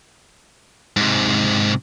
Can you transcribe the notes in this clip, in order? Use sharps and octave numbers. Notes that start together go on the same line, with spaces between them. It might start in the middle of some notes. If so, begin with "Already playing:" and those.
G#2 C3